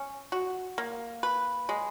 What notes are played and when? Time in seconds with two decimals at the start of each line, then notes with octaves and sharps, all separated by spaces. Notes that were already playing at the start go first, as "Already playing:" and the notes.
Already playing: C#4
0.32 F#4
0.78 A#3
1.23 B4
1.69 G#3